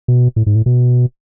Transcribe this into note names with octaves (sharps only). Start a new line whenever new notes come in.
B2
A2
G#2
A2
B2